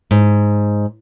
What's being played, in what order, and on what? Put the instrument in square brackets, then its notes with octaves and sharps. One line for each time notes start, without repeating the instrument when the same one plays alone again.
[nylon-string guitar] G#2